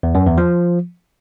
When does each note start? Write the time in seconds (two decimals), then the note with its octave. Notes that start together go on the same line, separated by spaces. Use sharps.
0.03 E2
0.15 F#2
0.26 E2
0.38 F3